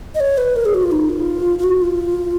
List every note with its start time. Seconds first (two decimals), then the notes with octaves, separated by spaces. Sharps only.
0.15 D#5
0.20 C#5
0.38 B4
0.56 A#4
0.65 G#4
0.74 F#4
0.83 F4
0.92 D#4
1.10 F4
1.59 F4
1.64 F#4
1.82 F4